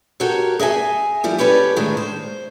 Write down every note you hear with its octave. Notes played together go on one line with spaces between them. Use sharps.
F#4 G4 A4 A#4 C#5
G#4 D#5 E5 G#5
F3 G3 E4
C#4 G4 A4 B4 C#5 D5
A2 D#3 G#3 D4
C5